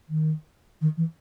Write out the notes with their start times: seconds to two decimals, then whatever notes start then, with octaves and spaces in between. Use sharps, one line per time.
0.10 D#3
0.81 D#3
0.97 E3